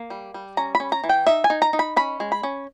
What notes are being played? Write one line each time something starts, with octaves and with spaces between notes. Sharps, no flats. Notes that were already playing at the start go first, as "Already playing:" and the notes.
Already playing: A#3
G3
G3
C#4 A#5
B5
C#4
A#5
E3
G5
D#4 E5
G#5
D#4
A#5
D#4
B5
C#4 B5
G#3
B5
C#4